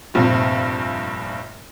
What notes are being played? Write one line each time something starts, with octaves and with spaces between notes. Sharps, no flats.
F1 A#1 G2 C3